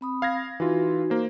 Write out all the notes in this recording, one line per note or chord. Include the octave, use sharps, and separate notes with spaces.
C4 B5 D#6
F5 G#6 A#6
E3 D#4 F4 F#4
A#3 C5